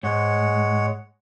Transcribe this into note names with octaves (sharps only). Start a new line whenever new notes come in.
G#2 G#3 C#5 F#5